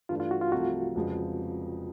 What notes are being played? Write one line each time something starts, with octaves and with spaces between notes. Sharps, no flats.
G2 E3 A3 D4 F4
F4
F#4
F4
C2 C3 F3 A3 F#4
F1 F2 C#3 F3 G#3